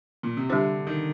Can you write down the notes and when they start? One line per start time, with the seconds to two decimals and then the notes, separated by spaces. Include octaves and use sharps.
0.23 A#2
0.37 C3
0.49 D3 G3 D4 G4 C5
0.87 D#3